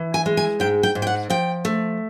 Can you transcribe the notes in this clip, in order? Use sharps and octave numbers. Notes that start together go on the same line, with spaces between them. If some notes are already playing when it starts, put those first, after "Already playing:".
Already playing: E3
G#5
G#3
G#5
G#2 G5
G5
G#2
G5
F#5
F3 G5
A3